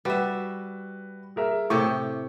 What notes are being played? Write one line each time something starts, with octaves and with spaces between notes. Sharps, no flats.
G3 F#4 B4 E5
G#4 A#4 E5
A2 C3 G4 C#6